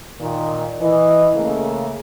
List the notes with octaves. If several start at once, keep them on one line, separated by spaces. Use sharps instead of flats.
A#2 D#3
E3 D#5
C#3 A3 A#3